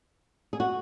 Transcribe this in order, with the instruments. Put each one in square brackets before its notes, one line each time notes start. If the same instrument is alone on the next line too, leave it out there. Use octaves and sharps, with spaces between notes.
[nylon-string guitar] G#4
F#4